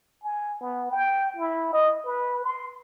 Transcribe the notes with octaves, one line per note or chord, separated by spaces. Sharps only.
G#5
B3
G5
E4
D#5
B4
C6